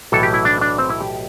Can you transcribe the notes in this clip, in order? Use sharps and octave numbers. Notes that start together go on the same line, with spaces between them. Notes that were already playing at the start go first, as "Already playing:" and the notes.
B1 A2 E3 A4
G4
E4
D4
D4
C4
E4
G4